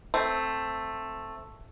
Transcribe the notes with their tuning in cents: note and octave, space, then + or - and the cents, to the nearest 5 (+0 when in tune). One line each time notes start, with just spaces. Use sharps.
A3 +5 C4 +0